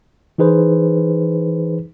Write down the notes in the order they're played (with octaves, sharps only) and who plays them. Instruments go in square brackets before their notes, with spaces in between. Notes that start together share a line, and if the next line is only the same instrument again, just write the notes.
[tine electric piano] E3 D#4 G#4 B4 C5